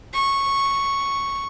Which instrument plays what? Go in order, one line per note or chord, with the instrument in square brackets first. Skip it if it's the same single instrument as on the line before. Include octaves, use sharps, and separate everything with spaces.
[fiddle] C#6